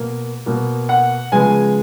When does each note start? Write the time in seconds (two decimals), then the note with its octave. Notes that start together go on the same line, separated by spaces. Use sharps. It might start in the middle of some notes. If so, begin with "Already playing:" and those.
Already playing: B2 A#3
0.46 B2 A#3
0.89 F#5
1.32 C#3 F3 G#3 B3 G#5